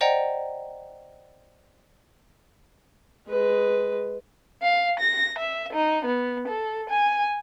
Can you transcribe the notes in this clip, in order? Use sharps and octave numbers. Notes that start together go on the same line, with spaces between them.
C5 D5 D#5 F#5 G5 A#5
G#3 B4
F5
A#6
E5
D#4
B3
A4
G#5